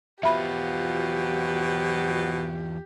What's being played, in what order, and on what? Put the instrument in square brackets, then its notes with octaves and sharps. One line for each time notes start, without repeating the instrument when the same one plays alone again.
[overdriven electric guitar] E2 F4 [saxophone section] B2 F3 F#3 [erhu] G4 [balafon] E5 B5